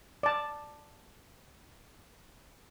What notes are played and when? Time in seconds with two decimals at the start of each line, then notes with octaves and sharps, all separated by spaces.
0.23 D5 A5